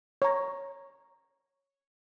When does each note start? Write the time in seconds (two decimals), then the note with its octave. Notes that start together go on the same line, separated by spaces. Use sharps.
0.22 C#5 A#5